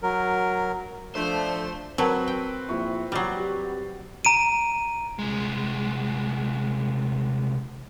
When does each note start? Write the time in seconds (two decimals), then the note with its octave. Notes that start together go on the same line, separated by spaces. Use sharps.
0.03 F#3 A#4
1.15 F3 A3 D4 C5
1.98 F#3 C4 A#4 B4 A5
2.28 G5
2.69 A#1 E4 C#6
3.12 F#3 G3 D6 A6 C7
3.37 G4
4.25 A#5 D7 D#7
5.19 C2 G#3